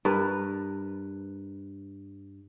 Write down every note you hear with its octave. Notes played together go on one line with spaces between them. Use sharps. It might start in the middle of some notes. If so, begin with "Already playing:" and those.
G2 A#4 B4